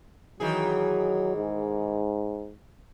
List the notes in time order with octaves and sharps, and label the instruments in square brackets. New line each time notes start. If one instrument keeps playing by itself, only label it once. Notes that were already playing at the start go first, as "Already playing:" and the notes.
[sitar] D#3 E3 G#4 [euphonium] F#3
[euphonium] G#2